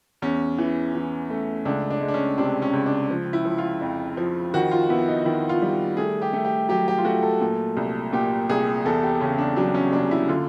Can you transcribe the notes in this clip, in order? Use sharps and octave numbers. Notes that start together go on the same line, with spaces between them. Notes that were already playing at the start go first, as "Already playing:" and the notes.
E2 C#4
E3
E3
A3
C#2 D4
D4
G#3
D4
C#4
C3 D4
C#4
C#2
D4
F3
E4
F3
F4
F2
F3
D#3 F#4
F4
B3 E4
D#4
D#3 E4
F4
G3
A3 G#4
G4
A3
G4
F#3 G4
G4
F4
A3 F#4
A4
A#2
C2
A#2 G4
C2 G#4
E2 A4
G4
C#3 C#4
D4
F#3 D4
C#4
F#1 D4
E4
D3 F4